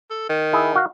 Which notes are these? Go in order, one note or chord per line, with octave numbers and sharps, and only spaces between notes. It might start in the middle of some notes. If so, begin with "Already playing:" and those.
A4
D#3
E4 G#4
F#4 F5